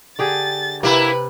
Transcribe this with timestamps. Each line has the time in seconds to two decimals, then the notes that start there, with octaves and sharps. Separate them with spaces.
0.19 D3 G4 G#4 A6
0.83 C3 A#3 E4 B4